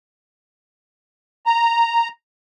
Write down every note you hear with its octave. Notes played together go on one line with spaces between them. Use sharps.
A#5